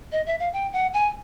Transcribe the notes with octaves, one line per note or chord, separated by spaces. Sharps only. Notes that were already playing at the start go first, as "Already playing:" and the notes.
D#5
E5
F5
G5
F#5
G#5